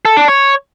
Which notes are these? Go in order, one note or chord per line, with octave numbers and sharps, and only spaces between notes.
A4
D4
C#5